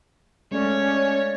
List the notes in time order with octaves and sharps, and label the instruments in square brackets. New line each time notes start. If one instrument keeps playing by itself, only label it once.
[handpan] G#3 A3 D5 [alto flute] C#4 [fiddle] C#5